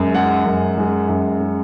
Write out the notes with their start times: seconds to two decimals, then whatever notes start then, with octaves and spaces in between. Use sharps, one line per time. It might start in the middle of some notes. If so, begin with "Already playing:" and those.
Already playing: F#2 G#3
0.14 G#3 F#5
0.46 F#2
0.78 G#3
1.09 F#2
1.41 G#3